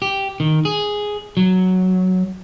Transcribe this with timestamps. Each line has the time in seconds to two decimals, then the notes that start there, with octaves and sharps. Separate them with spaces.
0.02 G4
0.40 D#3
0.65 G#4
1.37 F#3